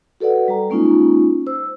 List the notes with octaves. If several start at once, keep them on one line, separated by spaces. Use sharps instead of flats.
F#4 A4 B4 D5 F#5
G3 A#5
G#3 A#3 C#4 D#4 F4
C5 E6